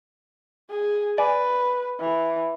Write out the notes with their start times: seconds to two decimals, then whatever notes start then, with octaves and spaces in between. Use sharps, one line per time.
0.70 G#4
1.18 B4 D5 G#5
2.00 E3